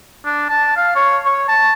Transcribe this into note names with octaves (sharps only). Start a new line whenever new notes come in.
D4
A5
F5
C#5
C#5
A5